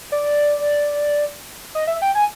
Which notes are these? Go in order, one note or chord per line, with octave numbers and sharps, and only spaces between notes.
D5
D#5
E5
G5
G#5